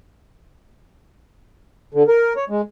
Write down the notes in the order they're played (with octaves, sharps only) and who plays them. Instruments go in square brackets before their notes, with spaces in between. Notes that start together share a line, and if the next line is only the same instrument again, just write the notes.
[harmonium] D3
A#4
C#5
G#3